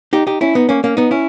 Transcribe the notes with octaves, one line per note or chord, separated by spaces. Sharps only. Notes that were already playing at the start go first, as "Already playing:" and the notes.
D#4 G4
D#4 G4
C#4 E4
B3 D#4
A#3 C#4
A#3 C#4
B3 D#4
C#4 E4